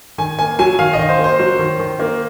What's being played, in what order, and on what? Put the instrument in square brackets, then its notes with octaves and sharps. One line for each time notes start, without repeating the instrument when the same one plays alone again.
[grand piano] D#3 G#5
A#3 G#5
F#3 G#5
D#3 F5
D#5
D#3
C5
A#3
C5
F#3
D#3
D#3
A#3